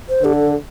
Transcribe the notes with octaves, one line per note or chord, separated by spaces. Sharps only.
C5
D3 G4
A4